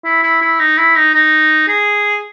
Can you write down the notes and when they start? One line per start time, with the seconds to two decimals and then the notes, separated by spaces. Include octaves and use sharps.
0.05 E4
0.23 E4
0.42 E4
0.60 D#4
0.77 E4
0.96 D#4
1.14 D#4
1.68 G#4